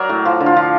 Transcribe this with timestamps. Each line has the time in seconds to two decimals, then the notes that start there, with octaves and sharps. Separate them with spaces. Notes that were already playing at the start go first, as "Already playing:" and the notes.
Already playing: F#3 A#4 D5
0.09 A2
0.25 F3
0.40 D3
0.46 F4
0.56 F3